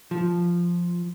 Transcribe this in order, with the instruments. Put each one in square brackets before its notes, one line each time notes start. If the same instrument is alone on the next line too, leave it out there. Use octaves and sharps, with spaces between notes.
[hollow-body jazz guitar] F3